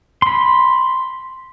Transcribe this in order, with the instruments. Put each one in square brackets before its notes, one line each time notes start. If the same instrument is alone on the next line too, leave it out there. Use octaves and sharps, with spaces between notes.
[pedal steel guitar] B5 C6